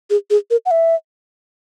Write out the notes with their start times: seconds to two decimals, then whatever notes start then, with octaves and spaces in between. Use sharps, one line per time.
0.10 G#4
0.30 G#4
0.51 A#4
0.66 F#5
0.71 E5